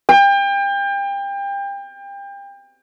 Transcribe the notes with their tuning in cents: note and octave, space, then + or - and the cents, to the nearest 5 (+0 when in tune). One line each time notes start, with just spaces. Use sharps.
G5 +30